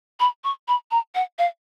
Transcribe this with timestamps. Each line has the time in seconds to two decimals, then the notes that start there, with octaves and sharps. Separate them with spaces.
0.20 B5
0.44 C#6
0.68 B5
0.91 A#5
1.15 F#5
1.39 F5